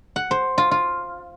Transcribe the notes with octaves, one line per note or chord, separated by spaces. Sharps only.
F#5
C5
F4
F4